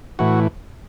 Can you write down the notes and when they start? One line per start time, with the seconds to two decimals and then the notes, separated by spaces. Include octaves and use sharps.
0.19 A2 E3 F#4